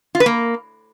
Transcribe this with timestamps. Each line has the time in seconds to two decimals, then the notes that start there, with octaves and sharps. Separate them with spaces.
0.15 F4
0.20 B4
0.26 A#3